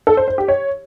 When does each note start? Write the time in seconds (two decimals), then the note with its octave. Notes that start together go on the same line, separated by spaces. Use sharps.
0.07 A4
0.17 C5
0.28 C5
0.38 G4
0.48 C#5